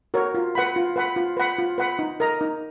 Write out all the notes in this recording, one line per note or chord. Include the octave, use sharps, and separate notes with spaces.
F#4 A#4 C#5
F4
B4 F#5 B5
F4
B4 F#5 B5
F4
B4 F#5 B5
F4
B4 F#5 B5
D#4
A#4 D#5 A#5
D#4